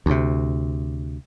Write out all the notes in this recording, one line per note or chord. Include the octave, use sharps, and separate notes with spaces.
D2 C3